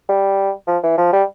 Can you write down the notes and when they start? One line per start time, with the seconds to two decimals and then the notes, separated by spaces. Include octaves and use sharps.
0.09 G3
0.67 F3
0.83 E3
0.98 F3
1.13 G3